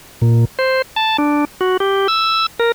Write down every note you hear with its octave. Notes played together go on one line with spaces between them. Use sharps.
A#2
C5
A5
D4
F#4
G4
E6
A#4